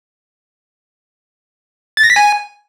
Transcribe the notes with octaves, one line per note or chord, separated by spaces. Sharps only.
A6
A#6
B6
G#5